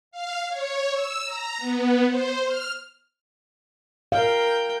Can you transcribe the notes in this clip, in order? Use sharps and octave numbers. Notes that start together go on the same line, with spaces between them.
F5
C#5
E6
A#5
B3
C5
F6
A#4 F5 G5